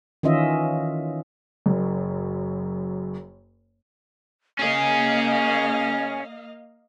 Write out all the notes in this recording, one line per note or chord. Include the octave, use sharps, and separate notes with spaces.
D#3 E3 C#4 F4 D#5 E5
F#1 F#2
A#3 C#4 G#4 D#5 F5 G#5